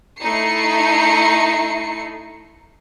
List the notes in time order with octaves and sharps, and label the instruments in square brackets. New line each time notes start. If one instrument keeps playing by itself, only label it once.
[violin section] A3 D#4 E4 C7 C#7